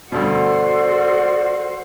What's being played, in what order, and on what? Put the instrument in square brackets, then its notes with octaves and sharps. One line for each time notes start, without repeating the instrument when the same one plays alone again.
[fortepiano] D2 G2 B2 [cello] F#4 C5 [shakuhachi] A4 [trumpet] D5